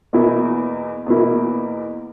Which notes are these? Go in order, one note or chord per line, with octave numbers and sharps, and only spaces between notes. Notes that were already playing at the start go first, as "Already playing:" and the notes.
E2 B2 A#3 E4
E2 B2 A#3 E4